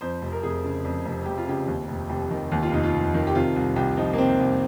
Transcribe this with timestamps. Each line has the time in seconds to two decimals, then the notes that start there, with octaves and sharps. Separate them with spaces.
0.01 F2 C5
0.22 F1
0.32 A#4
0.43 F1 G#4
0.64 C#3
0.85 F2
1.05 F1
1.26 F1 G4
1.38 F4
1.48 C#3 G4
1.67 D#2
1.88 F1
2.09 F1 G4
2.31 D#3
2.52 D#2 G4
2.63 F4
2.72 F1 D#4
2.83 F4
2.94 F1
3.14 D#3
3.27 G4
3.35 C3 F4
3.56 C2
3.76 C2 G4
3.97 F3 D#4
4.13 A#3
4.18 C3 C4
4.40 C2